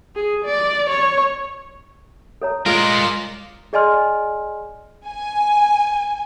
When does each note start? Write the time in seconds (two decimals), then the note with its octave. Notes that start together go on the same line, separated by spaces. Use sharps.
0.16 G#4
0.46 D5
0.90 C#5
2.42 A4 C#5 A#5
2.66 G#3 F4 A4 A#4 D5 A#5
3.73 G#4 D5 D#5 G#5 C6 F6
5.06 G#5